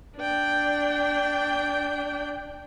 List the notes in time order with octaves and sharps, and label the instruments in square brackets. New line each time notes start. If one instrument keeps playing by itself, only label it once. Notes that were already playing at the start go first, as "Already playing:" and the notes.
[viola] D4 G5